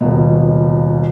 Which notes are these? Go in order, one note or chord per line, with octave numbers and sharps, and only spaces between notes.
D#1 C#2 B2